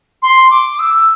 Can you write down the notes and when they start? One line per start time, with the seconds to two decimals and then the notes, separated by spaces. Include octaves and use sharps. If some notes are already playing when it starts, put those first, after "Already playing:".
0.22 C6
0.51 D6
0.79 E6